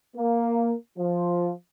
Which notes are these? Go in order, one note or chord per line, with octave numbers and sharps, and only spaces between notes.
A#3
F3